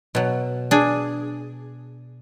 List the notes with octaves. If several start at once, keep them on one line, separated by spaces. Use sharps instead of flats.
B2 F#3
D4 G#4